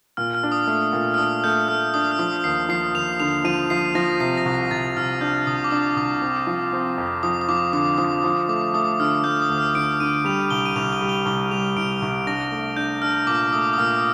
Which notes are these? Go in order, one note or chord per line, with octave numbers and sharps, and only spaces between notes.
A#2 F6
F6
D4
D#6
A3
A#2
F6
D4 D#6
A3 G6
A3 F6
D4 D#6
F6
F3 D#6
D#2 C7
F3 C7
D#2 F7
D3 F7
F3 D#7
F3 C7
F3 A#6
C3 C7
A#6
C2
A#6
C2 A6
C2 F6
D4 G6
C2 D#6
D6
D4 D#6
C2 D6
C4
F3
C4
F2
F3 D#6
D#6
F3 D6
D3 D#6
F3 D#6
F3
A3 D6
A3 D#6
D3 F6
A3 G6
D#6
D2
F6
D3 D7
D3 D#7
G3 F7
C2 G7
D#7
C2 F7
G7
G3
G7
C2 G7
G3 F7
C2 D7
C2
D4 A#6
A3
D4 G6
D4 F6
A#2 D6
A3 D#6
D#6
A#2 F6